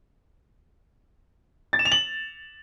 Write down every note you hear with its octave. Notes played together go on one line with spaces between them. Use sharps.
A6
E7
F7
F#7